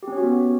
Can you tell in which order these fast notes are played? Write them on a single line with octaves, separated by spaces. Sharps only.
G4 C#4 C#5 F#4 B3